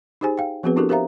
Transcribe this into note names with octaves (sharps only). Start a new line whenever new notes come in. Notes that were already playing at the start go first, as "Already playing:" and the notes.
D#4 G4 G#4 C5 G#5
F5 G5
F3 B3 C4 F#4 G#4 B4
D4 E4 F#4 G4 A4 A#4
G4 A#4 C5 E5 F5 A#5